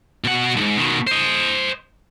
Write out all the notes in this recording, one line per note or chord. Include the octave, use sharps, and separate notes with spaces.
B2 F#5
C2 G#2
B2 D#3
C5 D#5